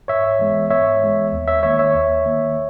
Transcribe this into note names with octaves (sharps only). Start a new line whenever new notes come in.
G#2 C#5 E5
E3 G#3 B3
G#2 C#5 E5
E3 G#3 B3
D#2
C#5 E5
D#3 A#3 C#5 E5
C#5 E5
D#2
D#3 A#3